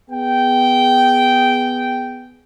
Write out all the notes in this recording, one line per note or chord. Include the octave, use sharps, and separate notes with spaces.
B3 G#4 G5